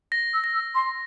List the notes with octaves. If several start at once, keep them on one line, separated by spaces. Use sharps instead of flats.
A#6
E6
A#6
E6
C6